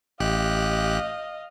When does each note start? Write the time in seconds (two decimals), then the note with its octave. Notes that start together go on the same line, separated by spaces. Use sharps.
0.20 A1 G4 D#5 F5 F#6